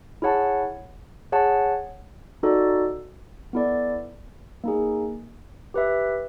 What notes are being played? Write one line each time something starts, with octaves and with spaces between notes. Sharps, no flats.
E4 G#4 C#5 F#5 A5
G#4 C#5 F#5 A5
D#4 F#4 A4 D5
B3 E4 A4 D5
A#3 D#4 G#4
G4 B4 E5